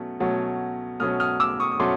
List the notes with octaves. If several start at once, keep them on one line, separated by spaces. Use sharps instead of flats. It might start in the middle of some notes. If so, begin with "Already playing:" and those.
Already playing: B2 F#3 A3 C#4
B2 F#3 A3 C#4
B2 F#3 A3 C#4 D#6 F6
D#6 F6
D6 E6
C#6 D#6
D#6
B2 F#3 A3 C#4 C6 D6